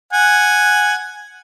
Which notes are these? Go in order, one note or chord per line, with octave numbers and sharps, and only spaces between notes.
F#5 G#5